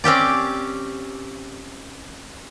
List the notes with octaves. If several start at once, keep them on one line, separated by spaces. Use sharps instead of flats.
C4 C#4 G4 D5